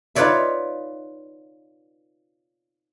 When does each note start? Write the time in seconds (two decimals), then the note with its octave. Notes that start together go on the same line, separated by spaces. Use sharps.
0.15 D#4 F4 B4 C#5 D5 E5